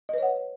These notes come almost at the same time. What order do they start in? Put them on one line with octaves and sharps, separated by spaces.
D#5 B4 C#5 F#5